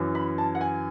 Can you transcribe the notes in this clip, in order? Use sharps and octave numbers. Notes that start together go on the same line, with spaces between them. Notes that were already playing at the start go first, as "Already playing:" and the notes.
Already playing: F#2 E3
B5
A5
F#5
G#5